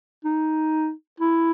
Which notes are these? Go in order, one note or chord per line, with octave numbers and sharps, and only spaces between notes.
D#4
E4